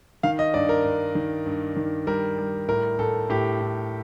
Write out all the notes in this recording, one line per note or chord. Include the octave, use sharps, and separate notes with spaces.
D#3 F5
D#5
G2 D5
A#4
G2
D#3
G2
D#3
G3 A#4
G3
A2 A#4
A2 A4
A2 G4
A2